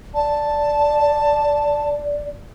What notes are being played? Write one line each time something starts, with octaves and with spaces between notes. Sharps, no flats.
D5 A5